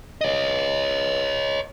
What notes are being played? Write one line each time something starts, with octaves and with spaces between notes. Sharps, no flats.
C#5 D#5